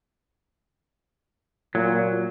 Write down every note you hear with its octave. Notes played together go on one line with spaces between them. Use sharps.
A#2 F#3